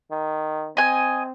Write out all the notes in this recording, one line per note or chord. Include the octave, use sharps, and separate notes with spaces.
D#3
C4 D#5 G#5